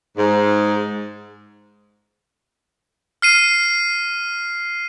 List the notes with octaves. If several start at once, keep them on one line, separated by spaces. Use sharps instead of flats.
G#2
F6 C7 D#7